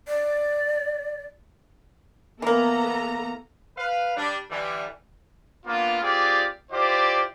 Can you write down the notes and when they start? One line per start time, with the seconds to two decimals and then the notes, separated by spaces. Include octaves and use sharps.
0.08 D5
2.42 E3 A#3 B3 A4 A#5
3.77 B4 F5
4.17 G3 D4
4.51 D3 E3 G3
5.66 A#3 B3 D4 F4
6.02 C4 F4 G4 G#4 D5
6.71 E4 F4 G4 C5 D5 D6